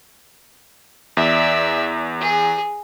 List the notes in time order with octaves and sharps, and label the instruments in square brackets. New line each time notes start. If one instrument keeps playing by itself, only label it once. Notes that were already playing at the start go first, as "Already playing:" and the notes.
[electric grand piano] E2 [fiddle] D5 E5
[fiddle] G#4